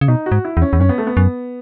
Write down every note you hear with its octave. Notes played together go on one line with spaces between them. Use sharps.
C#3
B2 D#4
F#4
G#2
E4
E2
C#4
E2
F#2 C#4
B3
A3
B3
F#2